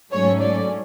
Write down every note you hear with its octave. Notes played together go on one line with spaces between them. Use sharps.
G#2 F#3 A3 C#4 C#5
D5